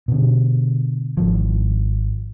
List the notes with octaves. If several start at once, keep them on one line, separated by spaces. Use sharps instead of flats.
B2 D3
G#1 F3